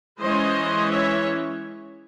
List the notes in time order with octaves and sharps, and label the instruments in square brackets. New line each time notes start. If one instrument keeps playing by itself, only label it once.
[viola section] E3 G#3 C#4 C5 D#5
C#5 E5